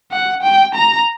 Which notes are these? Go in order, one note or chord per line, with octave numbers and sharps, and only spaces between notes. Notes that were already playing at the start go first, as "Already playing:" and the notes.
F#5
G5
A#5